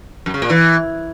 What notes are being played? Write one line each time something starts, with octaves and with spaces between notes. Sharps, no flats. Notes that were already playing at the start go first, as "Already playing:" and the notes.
F#2
C#3
A#2
E3